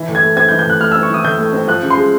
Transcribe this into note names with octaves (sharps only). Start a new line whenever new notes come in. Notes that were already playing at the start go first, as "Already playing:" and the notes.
Already playing: E3
A2
G#6
A3
C4 G#6
G6
E3
G6
A2 F#6
A3 F6
E6
C4
C#6
E3 D#6
A2 G6
A3
C4
F3 F#6
C#3
C6
G#3